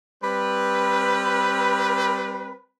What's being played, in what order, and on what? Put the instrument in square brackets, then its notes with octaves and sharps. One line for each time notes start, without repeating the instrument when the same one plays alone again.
[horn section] G3 C4 B4